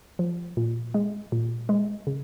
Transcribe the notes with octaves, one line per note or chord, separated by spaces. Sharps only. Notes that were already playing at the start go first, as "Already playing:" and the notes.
F3
A#2
G#3
A#2
G#3
C#3